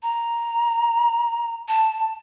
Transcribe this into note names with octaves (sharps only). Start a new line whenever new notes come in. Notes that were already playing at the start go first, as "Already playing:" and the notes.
A#5
A5